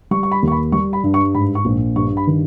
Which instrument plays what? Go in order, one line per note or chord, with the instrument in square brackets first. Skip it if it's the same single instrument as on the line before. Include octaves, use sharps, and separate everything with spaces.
[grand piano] G3 C#6
C#6
B5
D#2
C#6
B5
G3 C#6
B5
G2
C#6
G#2 B5
C#6
A#1
G2 C#6
B5
D#3